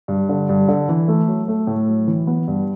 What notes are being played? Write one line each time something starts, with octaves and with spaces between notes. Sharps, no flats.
G2
D3
G2
D3
E3
A3
F#3
A3
A2
F#3
E3
B3
G2